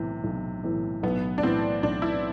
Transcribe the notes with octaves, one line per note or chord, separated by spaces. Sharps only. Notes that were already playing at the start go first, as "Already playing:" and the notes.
Already playing: B1 A2 C3 E3
B1
A2 E3
B1 B3
D4
A2 E3 C4
B1 D4
E4